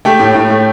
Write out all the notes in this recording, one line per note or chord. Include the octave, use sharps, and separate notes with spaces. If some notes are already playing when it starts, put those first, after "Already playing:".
A3 G4 G5
A2
A2
A3